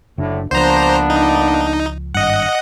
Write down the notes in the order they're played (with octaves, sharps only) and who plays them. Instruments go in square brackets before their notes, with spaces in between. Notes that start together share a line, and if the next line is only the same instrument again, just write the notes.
[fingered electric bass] F#1 D4 [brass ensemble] A2 D3
[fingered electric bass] C#2 F3 [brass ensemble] A#3 B3 D4 [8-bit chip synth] C5 A#5
[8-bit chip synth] D#4
[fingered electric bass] G#1 G2 [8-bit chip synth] D#5 F#5